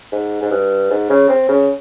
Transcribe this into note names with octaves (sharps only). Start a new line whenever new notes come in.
G#2
G#2
G2
G#2
C#3
C4
C#3